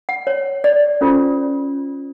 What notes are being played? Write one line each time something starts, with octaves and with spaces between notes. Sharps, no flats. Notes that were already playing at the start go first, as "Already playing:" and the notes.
F#5
C#5
D5
C#4 F4 A4 C5